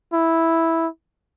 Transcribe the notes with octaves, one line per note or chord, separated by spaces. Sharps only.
E4